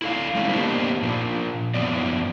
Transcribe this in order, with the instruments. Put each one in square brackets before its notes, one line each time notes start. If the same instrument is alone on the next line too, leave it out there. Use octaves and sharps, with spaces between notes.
[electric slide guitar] E4 A4 F5
G3 G#3 C#4 D#4 E4
A#3 B3 D4 D#4 G4 C5
A#2 F3
F#2 F3 B3 D5